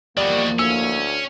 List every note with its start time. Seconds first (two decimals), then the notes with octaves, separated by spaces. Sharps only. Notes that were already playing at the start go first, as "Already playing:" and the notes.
0.17 E2 D#3 F3 G3 A#3 F#4 D5
0.59 D2 C#4 E6